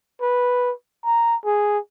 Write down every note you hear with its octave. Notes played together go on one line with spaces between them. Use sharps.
B4
A#5
G#4